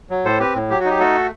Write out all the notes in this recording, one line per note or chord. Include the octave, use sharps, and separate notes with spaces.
F#3
A2 A4 C5
C4 G4 B4
A2
F#3 G4
F#4
D#4
G4
A3 F#4 A4